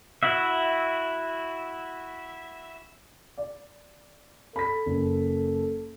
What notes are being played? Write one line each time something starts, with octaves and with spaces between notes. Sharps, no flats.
E4 F#4 E5
D5
A4 B5 B6
F#1